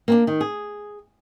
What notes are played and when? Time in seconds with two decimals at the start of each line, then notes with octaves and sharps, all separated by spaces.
0.08 A#3 C4 D4
0.27 D#3
0.41 G#4